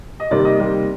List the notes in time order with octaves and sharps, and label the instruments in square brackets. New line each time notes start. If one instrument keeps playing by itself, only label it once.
[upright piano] D#5
C3 D#3 G3 A#3 D5
D#5
C3 D#3 G3 A#3